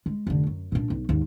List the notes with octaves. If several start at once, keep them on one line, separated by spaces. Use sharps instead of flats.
G#3
F1 D3
F#2
A#2 D4
B1
D#2 G#2